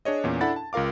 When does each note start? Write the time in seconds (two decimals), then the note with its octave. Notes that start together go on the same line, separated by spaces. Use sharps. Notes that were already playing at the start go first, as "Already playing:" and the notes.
0.05 D4 G#4 C#5 D#5
0.24 E2 A#2 C#4
0.41 D4 E4 A4 F#5 B5 A6
0.56 A5
0.73 C#2 F4 A#4 F5 D6